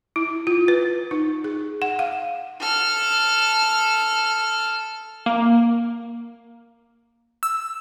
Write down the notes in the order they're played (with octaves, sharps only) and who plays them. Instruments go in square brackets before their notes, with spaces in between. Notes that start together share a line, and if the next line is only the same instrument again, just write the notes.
[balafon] E4
F4
B4
D#4
G#4
F#5
F5
[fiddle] A4 F6
[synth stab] A#3
E6